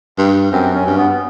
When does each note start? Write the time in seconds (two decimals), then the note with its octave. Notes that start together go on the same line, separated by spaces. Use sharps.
0.18 G2
0.51 F#2 C4
0.74 C#4
0.86 G2
0.97 B3